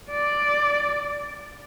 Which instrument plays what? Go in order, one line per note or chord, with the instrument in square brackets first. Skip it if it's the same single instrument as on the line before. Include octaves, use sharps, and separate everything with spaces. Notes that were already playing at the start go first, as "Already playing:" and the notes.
[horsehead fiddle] D5